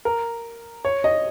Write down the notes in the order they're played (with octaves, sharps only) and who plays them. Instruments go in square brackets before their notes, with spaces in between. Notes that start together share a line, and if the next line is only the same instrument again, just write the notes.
[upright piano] A#4
C#5
D#5